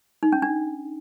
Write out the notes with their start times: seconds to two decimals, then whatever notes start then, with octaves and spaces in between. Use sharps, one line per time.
0.23 D#4
0.32 C#4
0.42 D4